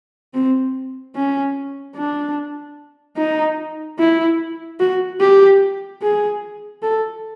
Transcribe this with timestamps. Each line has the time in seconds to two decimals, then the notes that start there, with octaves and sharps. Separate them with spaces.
0.34 C4
1.15 C#4
1.96 D4
3.17 D#4
3.99 E4
4.80 F#4
5.20 G4
6.02 G#4
6.83 A4